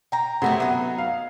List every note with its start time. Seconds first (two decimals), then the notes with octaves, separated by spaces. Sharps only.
0.12 G5 A#5
0.42 C3 F#3 A3 B3 E4
0.60 F#3 B3 D#4
0.98 F5